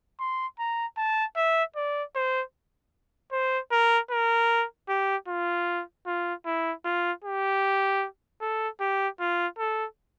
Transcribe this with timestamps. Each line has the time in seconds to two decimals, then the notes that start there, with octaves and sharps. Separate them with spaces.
0.19 C6
0.59 A#5
0.97 A5
1.36 E5
1.76 D5
2.15 C5
3.32 C5
3.71 A#4
4.11 A#4
4.89 G4
5.28 F4
6.06 F4
6.46 E4
6.85 F4
7.24 G4
8.41 A4
8.81 G4
9.20 F4
9.58 A4